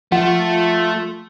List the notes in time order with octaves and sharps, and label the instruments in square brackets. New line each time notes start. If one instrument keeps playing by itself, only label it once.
[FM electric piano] F3 [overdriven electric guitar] A3 [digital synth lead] F4 [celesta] F#5